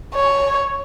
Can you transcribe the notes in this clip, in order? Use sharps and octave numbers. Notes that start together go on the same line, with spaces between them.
C#5